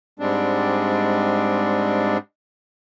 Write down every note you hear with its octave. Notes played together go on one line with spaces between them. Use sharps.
G#2 G3 G#3 C4 D4